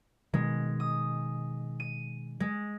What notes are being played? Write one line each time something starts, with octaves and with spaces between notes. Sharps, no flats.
B2 D#3 G#3
D#6
D#7
G#3